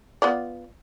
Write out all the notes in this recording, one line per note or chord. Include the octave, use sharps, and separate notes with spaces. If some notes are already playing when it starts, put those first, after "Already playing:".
B3 F4 D5